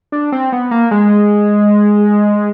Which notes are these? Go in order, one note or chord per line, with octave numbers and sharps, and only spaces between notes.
D4
C4
B3
A#3
G#3